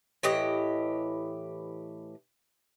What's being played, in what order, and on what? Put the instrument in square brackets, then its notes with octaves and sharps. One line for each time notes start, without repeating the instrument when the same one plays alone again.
[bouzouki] A2 E3 G4 D#5